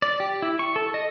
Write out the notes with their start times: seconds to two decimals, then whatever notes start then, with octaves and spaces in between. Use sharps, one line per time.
0.02 D5
0.20 G4
0.42 E4
0.59 C#6
0.76 A4
0.94 D#5